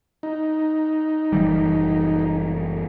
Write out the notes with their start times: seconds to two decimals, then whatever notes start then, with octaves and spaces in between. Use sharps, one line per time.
0.23 D#4
1.32 F#1 E3 G3